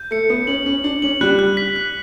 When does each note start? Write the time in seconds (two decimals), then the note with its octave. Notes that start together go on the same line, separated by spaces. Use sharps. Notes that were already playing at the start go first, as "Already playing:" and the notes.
Already playing: G6
0.11 A3 C#7
0.30 B3 C#7
0.47 C#4 F#7
0.66 C#4 F#7
0.84 D4 F#7
1.02 C#4 F#7
1.21 G3 F#6
1.39 F#6
1.57 B6
1.76 F#6